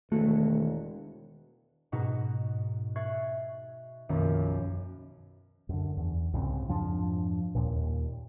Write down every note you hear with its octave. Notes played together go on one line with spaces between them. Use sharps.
E1 D#3 A3 F#4
G#2 B2 D#4 F#4
E5 C#6 F#6 G#6 A6 C7
B1 F#2 D#3 F3 A#3
F#2 D3
E2
C2 G#2 C#3 C4
F2 G#2 F3 D4
D#2 A#2